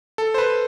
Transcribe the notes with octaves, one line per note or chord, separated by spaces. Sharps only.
A4
C5
B4